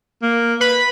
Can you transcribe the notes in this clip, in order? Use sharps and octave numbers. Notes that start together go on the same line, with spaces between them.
A#3
B4 B5